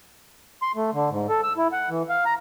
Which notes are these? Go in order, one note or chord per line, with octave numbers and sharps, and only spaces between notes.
C6
A3
D3
G#2
A4
E6
E4
F#5
E3
F5
A#5